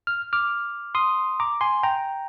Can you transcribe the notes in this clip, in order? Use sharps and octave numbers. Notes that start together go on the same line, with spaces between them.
F6
D6 F6
C6 D#6
A#5 D6
G#5 C6
G5 A#5